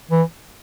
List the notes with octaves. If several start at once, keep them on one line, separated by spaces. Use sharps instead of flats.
E3